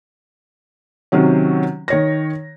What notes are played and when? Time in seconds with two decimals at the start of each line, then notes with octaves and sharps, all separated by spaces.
1.12 C3 D#3 F#3 C#4
1.88 D#3 C#5 A#6